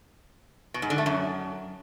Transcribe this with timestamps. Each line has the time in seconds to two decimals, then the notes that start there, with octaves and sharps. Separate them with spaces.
0.74 B2
0.82 G#2
0.90 D3
0.98 A3
1.06 F#2